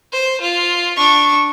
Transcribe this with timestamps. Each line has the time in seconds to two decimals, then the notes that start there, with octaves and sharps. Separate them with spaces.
0.13 C5
0.41 F4
0.96 D4 C#6